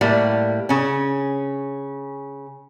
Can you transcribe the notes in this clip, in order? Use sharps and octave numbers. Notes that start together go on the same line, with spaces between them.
A2 G3 A#3
C#3 C#4